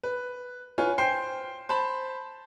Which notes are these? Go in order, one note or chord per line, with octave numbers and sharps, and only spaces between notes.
B4
F4 B4 C#5 G#5
C5 G5 C7
C5 A5 B5